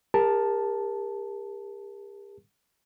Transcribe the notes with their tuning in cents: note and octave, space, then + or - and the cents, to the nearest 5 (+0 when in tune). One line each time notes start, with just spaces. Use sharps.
G4 +45 A#4 +10 A5 +0